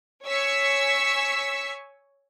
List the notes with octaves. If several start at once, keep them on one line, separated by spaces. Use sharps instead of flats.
C#5 G#5 C#6 E6 B6 C#7